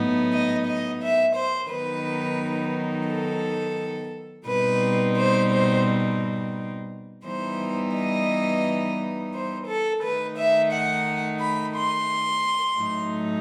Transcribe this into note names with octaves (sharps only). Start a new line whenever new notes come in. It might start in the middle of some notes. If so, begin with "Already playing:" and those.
Already playing: A2 F#3 B3 D#4
D#5
D#5
E5
C5
D#3 F#3 B3 D#4 B4
A4
B2 G3 C4 D#4 B4
C5
C5
E3 G3 B3 D#4 C5
D#5
C5
A4
D#3 A3 D#4 B4
E5
F#5
B5
C6
A2 F#3 A3 D#4